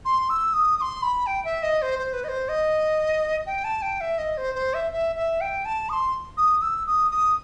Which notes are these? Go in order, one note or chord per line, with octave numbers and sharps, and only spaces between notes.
C6
E6
D#6
D#6
C6
B5
G5
E5
D#5
C5
C5
B4
D#5
C5
D#5
G5
A5
G5
E5
D#5
C5
C5
E5
E5
E5
G5
A5
D#6
C6
D#6
E6
D#6
D#6